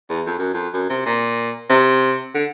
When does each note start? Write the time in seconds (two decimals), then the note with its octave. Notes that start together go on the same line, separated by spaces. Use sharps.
0.09 E2
0.26 F2
0.39 F#2
0.54 F2
0.74 F#2
0.90 C3
1.05 A#2
1.70 C3
2.34 D3